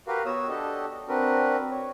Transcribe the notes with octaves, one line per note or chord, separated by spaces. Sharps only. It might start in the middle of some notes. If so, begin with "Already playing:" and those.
F#4 G4 A#4 B4 F5
B3 F#4 C#5 D#6 E6
D4 F#4 G4 A4 D#5
C4 D4 F#4 A#4 B4
C#5